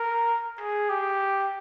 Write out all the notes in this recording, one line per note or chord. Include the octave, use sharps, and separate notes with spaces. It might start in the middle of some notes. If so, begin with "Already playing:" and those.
Already playing: A#4
G#4
G4